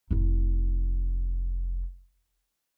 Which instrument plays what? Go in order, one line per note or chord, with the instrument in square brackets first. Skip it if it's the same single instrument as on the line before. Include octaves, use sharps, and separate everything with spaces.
[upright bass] F1 E4